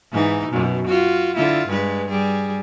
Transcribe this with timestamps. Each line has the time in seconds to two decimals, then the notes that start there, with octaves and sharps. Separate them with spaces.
0.12 G#2 E3 D#4
0.48 F#2 B2
0.87 F4 F#4
1.36 D3 E4 F4
1.68 G2 G#3 B4
2.08 G3 G#4